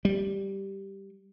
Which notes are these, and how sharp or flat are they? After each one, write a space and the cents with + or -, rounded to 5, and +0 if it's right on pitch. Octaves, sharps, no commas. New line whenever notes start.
G3 -5